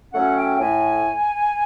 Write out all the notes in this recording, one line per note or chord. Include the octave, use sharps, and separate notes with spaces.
F#3 A3 C#4 F#5
G5
A2 G#5